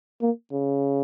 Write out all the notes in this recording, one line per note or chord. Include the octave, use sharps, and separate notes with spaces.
A#3
C#3